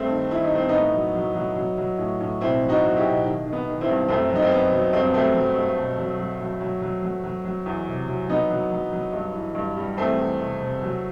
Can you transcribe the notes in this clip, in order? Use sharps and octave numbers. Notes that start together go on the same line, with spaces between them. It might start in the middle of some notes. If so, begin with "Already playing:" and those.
Already playing: G2 A3 C4
D#3
D#3 E4
D#4
G2 C4
A2 B3 D#4
F#3
F#3
F#3
F#3
F#3
A2
A2
B2 C4 E4
F#3
D#4 F#4
F#3
E4 G4
B2
D#3
D#3
B3
D#3
C4 E4
G2
F#2 A3 C4
F#3
D#4
C4
F#2 B3
F#3
G2 C4
B3
F#3 A3 C4
F#3
G2
B2
F#3
F#3
F#3
F#3
F#3
F#3
F#3
F#3
E2
C3
F#3
F#3 B3 D#4
F#3
F#3
F#3
G2
E3
G2
G3
E2 A3 C4
E2
C3
C3
F#3